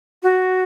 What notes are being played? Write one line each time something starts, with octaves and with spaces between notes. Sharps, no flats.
F#4